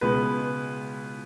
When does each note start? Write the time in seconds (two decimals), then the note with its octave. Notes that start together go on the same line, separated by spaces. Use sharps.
0.01 C#2 B2 G#3 B3 B4